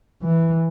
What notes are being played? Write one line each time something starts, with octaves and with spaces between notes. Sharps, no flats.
E3